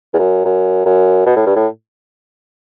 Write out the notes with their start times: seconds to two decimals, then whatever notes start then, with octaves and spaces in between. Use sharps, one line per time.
0.14 E2
0.19 F#2
0.45 F#2
0.86 F#2
1.26 B2
1.36 A2
1.46 G2
1.56 A2